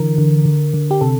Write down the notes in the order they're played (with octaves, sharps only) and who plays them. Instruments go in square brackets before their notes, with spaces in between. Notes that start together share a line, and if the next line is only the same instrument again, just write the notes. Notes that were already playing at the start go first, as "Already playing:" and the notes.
Already playing: [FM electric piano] D3 E3 A#4
D3
D3
D3
G4
C3 A4